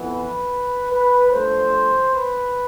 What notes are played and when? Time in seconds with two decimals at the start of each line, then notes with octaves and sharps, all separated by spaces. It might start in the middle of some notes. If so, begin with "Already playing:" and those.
Already playing: F2 E3 B3
0.10 B4
0.91 B4
1.31 G2 F3 A3 C5
2.13 B4